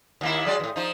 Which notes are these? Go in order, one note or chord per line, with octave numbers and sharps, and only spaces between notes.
D#2 A#3 E4
F#3 G#3 D5
E2 A2
F3 D#4